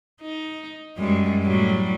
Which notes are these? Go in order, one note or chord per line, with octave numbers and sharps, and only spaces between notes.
D#4
F#2 G3 G#3
A2 F#3 G3